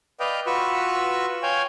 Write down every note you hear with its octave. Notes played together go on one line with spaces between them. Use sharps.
B4 D5 D#5 F5 G5
F4 F#4 B4 B5 C#6 E6
C#5 F5 G5 G#5